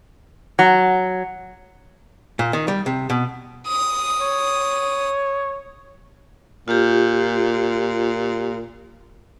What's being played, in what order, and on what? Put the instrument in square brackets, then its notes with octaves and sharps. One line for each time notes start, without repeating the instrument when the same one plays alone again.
[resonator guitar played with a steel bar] F#3
[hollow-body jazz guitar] A#2
D#3
G3
C3
B2
[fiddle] D#6
[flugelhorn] C#5
[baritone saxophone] A#2 [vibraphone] F4 G4